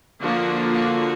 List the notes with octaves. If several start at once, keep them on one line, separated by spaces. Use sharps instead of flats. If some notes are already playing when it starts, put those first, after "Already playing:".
D3 F3 A#3 D4 F#4
F#4